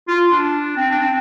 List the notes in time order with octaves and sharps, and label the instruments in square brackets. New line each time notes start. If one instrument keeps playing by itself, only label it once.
[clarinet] F4
D4
C4
D4
C4